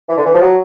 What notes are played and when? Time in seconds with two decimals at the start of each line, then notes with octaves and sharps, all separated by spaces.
0.08 E3
0.16 D3
0.25 E3
0.32 F3
0.41 F#3